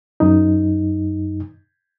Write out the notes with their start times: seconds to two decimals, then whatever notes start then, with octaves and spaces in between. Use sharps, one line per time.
0.20 F#2 D#4